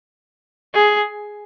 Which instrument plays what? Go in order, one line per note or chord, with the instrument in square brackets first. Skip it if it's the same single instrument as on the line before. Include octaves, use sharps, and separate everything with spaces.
[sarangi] G#4